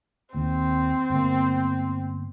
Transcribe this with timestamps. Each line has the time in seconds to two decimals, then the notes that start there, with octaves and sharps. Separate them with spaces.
0.35 D#2 C4
1.10 G1 A#3